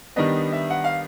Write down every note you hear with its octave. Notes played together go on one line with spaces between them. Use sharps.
D#3 G3 B3 D4 D#5
E5
F#5
F5